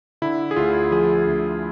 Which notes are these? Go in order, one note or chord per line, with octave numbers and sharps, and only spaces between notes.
D3 E4
G#4
D2 F4
F3 G#4
D2